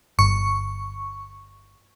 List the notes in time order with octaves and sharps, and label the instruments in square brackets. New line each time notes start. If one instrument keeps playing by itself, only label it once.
[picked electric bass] G1 [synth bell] C#6